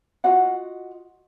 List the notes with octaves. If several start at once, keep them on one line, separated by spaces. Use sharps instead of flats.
F4 F#4 D#5 F#5